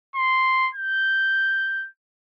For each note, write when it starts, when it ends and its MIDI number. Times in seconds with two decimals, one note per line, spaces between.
0.15 0.69 84
0.75 1.88 91